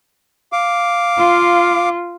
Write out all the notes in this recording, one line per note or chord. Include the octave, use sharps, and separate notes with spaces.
F5 D6
F4